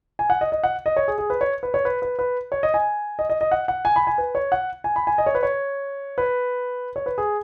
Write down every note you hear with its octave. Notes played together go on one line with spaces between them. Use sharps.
G#5
F#5
D#5
D#5
F#5
D#5
C#5
G#4
G#4
B4
C#5
B4
C#5
B4
B4
B4
C#5
D#5
G#5
D#5
D#5
D#5
F#5
F#5
G#5
B5
G#5
B4
C#5
F#5
G#5
B5
G#5
D#5
C#5
B4
C#5
B4
C#5
B4
G#4